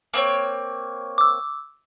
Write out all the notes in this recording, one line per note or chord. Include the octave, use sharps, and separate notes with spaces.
A#3 C4 C#5
D6 E6